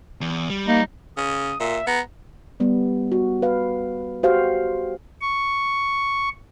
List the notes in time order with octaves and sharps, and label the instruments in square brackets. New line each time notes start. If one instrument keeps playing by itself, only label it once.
[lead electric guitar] E2
G3
[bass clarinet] A#3 [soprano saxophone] D#4
[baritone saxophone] C#3 [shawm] D#6
[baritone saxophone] A#2 [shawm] E5
[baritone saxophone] B3 [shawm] A#5
[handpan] G3 B3
F#4
B4 F5
F#4 G4 C5 F5
[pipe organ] C#6